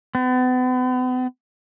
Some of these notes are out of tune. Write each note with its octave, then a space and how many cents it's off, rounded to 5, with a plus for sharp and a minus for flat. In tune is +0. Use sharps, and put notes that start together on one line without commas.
B3 +40